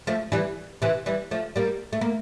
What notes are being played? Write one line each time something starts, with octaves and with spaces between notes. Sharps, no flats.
F3 A3
E3 G3
C3 E3
E3 G3
F3 A3
G3 A#3
A3
A#3